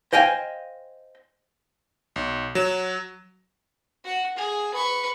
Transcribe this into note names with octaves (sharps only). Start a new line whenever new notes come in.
C5 D#5 F5 G5 G#5
B1
F#3 E7
F#4 F#5
G#4
B4 C#6